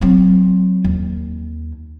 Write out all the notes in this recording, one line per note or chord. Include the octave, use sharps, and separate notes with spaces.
F#3 C4
D#2